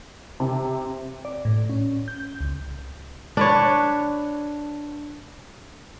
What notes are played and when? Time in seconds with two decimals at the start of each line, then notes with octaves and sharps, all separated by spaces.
0.40 C3
1.25 D5
1.45 A2
1.70 C#4
2.08 G6
2.41 C#2
3.37 D4 B4 C#5